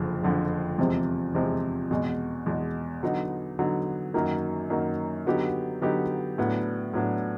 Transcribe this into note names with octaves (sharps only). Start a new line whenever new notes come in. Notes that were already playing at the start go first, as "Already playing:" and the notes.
Already playing: F#1 F2 D3 F3
F#1 F2 D3 F3
E2 C3 F3 G#3 C4
E2 C3 F3 G#3 C4
E2 B2 G#3
E2 B2 G#3
D3 F#3 B3 D#4
D3 F#3 B3 D#4
F#2 D#3 F#3 A#3
F#2 D#3 F#3 A#3
D3 F#3 B3 D#4 G4
D3 F#3 B3 D#4 G4
A2 F#3 B3 D4
A2 F#3 B3 D4